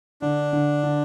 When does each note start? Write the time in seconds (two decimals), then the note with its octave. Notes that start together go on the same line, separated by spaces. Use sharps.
0.22 D3 D4
0.53 D3
0.84 D3